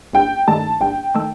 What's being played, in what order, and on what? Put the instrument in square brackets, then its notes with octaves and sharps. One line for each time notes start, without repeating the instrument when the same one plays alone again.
[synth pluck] G1 [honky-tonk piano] G5
[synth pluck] G2 D#3 A3 [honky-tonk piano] A5
[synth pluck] G1 [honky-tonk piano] G5
[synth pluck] D#3 A3